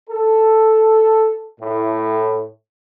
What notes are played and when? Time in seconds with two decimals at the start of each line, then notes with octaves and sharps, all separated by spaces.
0.10 A4
1.60 A2